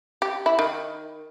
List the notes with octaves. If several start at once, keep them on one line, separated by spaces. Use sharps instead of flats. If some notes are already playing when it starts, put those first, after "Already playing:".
G4
E4
D#3